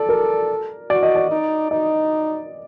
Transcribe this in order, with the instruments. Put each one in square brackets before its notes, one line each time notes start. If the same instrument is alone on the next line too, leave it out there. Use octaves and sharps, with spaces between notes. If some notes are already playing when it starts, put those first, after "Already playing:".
Already playing: [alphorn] A4 [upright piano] D5
[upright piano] A#4
[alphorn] F#4 [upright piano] D5
[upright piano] D#5
D5
[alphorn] D#4
[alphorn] D#4 [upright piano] D#5